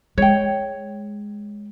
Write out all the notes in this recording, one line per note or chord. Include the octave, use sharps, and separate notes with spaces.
G#3 C#5 G5